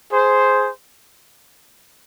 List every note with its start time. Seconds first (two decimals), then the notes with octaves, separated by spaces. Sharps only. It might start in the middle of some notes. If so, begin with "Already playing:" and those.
0.12 G#4 C5